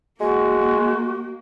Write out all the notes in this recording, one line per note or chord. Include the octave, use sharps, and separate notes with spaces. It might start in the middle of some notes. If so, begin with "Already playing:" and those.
G#3 A#3 F#4